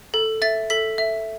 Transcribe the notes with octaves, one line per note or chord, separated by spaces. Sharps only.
A4
E5 A6
A4 B6
E5